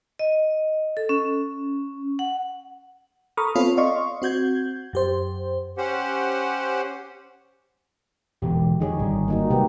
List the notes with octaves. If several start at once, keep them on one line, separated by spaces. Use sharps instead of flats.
D#5
A4
C#4
F#5
A4 A#5 B5 C#6 D#6 F6
B3 C4 F4 A4 C#5
D5 D#5 F5 C6 C#6
C4 F#4 G6 G#6
F#2 G4 C5
C#4 G4 C5 F#5
E1 B2 D3 G4
F2 D3 D#4 G#4 C#5
G#1 D3 G3
A#3 D#4 F#4
C3 G#3 A#3 C4 G4 B4